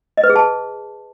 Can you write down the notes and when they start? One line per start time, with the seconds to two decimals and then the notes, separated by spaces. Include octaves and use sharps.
0.17 D#5
0.24 B4
0.30 G#4
0.36 A5